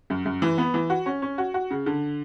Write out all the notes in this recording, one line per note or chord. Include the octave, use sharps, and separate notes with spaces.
F#2
F#2
E3
B3
E3
F#4
C#4
C#4
F#4
F#4
C#3
D3